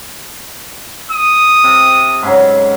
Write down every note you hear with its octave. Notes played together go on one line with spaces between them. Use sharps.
D#6
C3
G#2 C#3 F#3